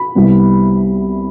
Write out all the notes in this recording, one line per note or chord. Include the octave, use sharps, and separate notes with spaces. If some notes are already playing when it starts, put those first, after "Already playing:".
Already playing: B5
C2 C3 G3 B3